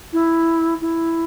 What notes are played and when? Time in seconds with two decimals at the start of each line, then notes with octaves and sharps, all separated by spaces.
0.12 E4
0.81 E4